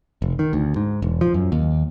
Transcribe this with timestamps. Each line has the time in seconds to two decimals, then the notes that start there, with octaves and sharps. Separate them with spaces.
0.22 F1
0.39 D#3
0.53 D2
0.76 G#2
1.02 E1
1.21 F3
1.34 F#2
1.52 D#2